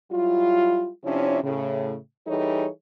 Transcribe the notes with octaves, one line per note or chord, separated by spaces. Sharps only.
F#3 G3 E4 F4
C3 F3 C#4 D4 E4 C#5
A2 C#3
E3 G3 D#4 G#4 A4 C#5